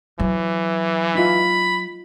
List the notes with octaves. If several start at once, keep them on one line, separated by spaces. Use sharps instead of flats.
E3 F#3
D#4 F4 B5